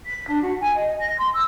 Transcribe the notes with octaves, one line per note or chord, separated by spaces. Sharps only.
B6
D4
F#4
G#5
D#5
A#6
C6
E6